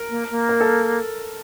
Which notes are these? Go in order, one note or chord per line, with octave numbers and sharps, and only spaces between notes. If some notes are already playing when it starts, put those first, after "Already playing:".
Already playing: A#4
A#3
A#3
A#4
A4